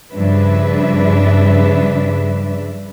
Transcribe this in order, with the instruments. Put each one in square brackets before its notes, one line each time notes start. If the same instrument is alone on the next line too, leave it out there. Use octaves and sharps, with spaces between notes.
[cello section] G2 C#3 F3 D4 B4 E5